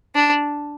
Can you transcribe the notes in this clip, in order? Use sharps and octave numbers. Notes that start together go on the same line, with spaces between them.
D4